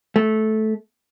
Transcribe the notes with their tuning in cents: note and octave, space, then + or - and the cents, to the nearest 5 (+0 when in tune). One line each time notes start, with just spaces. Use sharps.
A3 -15